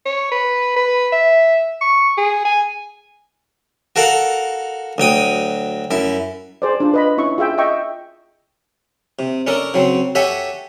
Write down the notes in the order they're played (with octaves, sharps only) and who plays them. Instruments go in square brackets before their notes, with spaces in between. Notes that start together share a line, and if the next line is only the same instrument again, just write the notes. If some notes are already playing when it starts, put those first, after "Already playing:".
[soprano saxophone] C#5
B4
B4
E5
C#6
G#4
G#5
[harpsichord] F#4 A4 A#4 F5 F#5
D2 F#3 G5 D#6
F#2 E4
[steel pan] G#4 C5 D5
D4 F4
B4 D#5 B5
C#4 E4 C#6
F4 G#4 E5 G5
D#5 E5 G5 C#6
[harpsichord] C3
C#4 D4 A4 A#4
C#3 F#3 C4
G4 A4 C#5 E5 F#5 G#5